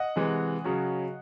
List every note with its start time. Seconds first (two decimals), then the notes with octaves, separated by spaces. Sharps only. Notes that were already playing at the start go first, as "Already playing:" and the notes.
Already playing: D#5 F#5
0.16 C3 E3 G#3
0.64 C#3 F#3 C#4